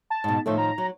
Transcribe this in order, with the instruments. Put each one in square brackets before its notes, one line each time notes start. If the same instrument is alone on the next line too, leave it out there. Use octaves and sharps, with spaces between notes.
[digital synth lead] A5
[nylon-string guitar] G#2 B2
[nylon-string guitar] A2 D#3 F3 [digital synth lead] A3
[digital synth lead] A#5
[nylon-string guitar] F#3